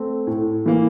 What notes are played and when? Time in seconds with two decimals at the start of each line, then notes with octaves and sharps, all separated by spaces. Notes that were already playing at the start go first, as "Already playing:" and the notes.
Already playing: A3 C4
0.27 A2
0.66 E3 A#3